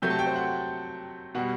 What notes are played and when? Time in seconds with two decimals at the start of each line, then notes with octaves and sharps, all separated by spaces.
0.02 C3 F#3 A3 G6
0.10 A5
0.19 G5
0.27 C5
0.36 F#5
1.35 B2 G3 F#5